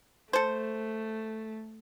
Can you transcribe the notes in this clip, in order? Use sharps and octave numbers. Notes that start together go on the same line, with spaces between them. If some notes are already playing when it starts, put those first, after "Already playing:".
A3 A4 C5